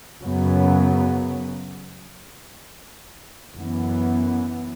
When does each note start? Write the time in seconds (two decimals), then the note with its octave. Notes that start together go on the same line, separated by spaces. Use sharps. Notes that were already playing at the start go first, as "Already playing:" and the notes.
0.22 F#2 C#3 F#3 B3
3.55 F#2 E3 B3